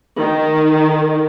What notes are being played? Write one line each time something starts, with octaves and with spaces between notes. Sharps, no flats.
D#3